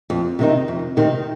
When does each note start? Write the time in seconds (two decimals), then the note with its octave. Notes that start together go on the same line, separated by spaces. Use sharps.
0.10 F2
0.39 C3 D#3 C4 D#4
0.68 F2
0.97 C3 D#3 C4 D#4